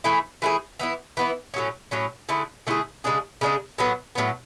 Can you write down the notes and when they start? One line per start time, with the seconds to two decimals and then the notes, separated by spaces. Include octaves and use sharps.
0.04 E3 A3 E4 G#4
0.42 E3 A3 E4 G#4
0.79 E3 B3 E4
1.17 E3 B3 E4
1.54 A2 F#3 C#4
1.91 A2 F#3 C#4
2.29 D3 A3 E4 G#4
2.67 D3 A3 E4 G#4
3.04 C#3 G#3 D4 G#4
3.41 C#3 G#3 D4 G#4
3.78 A2 F#3 B3
4.15 A2 F#3 B3